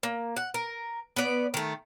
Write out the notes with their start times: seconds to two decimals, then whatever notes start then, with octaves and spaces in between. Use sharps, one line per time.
0.03 A#3
0.36 F#5
0.54 A#4
1.16 B3 D5
1.54 D#3 A3